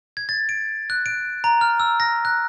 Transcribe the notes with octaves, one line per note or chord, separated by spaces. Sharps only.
G#6
A6
D7
F#6
D7
A#5
F6
E6
A#6
F#6